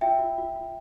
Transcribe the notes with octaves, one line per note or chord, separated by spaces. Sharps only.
F4 E5 G5
F4
F4
F4